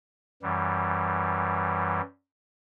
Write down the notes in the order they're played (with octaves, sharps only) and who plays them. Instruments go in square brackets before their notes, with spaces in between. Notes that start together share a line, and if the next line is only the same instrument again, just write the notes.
[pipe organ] F#2 E3 G3